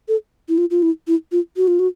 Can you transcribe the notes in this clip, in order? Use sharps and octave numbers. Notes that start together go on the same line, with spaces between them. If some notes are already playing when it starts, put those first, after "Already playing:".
A4
E4
F4
F4
E4
E4
F4
F#4
F4
F#4